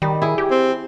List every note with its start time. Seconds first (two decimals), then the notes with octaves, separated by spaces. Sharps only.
0.02 D#3 G3
0.22 E4 G#4
0.38 G4
0.51 C4